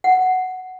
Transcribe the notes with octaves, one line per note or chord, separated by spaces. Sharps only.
F#5